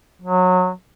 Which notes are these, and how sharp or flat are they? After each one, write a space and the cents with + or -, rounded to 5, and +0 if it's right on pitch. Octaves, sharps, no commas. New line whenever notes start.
F#3 -20